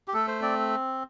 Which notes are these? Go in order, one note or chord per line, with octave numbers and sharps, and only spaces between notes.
G4
A3 A4
C5
C4 D5